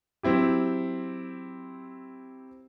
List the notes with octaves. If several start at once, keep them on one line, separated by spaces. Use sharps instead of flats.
F#3 C4 E4 G4